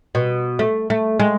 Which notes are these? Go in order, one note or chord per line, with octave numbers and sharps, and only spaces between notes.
B2
A3
A3
G#3